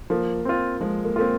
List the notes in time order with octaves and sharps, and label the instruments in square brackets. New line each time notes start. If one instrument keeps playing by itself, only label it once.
[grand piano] F3 [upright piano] A#3
[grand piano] C4 F4
[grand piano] F3 [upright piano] G#3
[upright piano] A#3
[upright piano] A#3 [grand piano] C4 F4